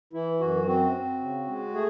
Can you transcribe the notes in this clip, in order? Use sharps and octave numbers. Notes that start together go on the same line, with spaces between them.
E3 E4
F#2 F#4
C4 F#4
C4
C#3
G#3
A3 G#4